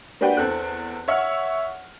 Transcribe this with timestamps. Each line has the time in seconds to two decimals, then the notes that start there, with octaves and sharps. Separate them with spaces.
0.21 A#3 D4 F#4 G4 B4 G5
0.37 E2 C4 A4 F#6
1.08 C#5 E5 F#5 C#6 F6